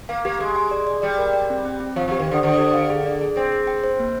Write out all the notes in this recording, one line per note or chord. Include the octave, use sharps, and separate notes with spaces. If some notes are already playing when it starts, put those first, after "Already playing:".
A#3 F5
A#3 G4
G#3 G4
G#5
D5
D5
G3 D5
A#4
D5
C4
C4
C4
F3 F5
F3 G4
D#3
D3 C5
D3 C5
G4
F5
G#4
D5
G#4
C4 G#4
G#4
G5
C5
A#3